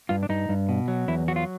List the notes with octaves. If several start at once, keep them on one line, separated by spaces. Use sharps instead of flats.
G2 F4
D4
G2 D#4
G2
B2
F#3
E2 E4
F#3 F#4
F4